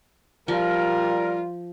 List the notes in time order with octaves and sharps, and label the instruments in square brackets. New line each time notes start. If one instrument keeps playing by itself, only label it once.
[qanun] F3 [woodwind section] G3 A#4 [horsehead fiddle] F4